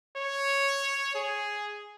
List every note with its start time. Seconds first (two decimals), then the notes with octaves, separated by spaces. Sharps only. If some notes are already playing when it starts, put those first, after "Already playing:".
0.16 C#5
1.15 G#4